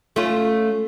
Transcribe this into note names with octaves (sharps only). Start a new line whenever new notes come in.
A3 C#4 F4